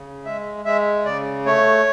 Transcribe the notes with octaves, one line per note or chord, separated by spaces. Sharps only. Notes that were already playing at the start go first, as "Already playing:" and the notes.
Already playing: C#3
G#3 E5
G#3 E5
C#3 D5
A3 C#5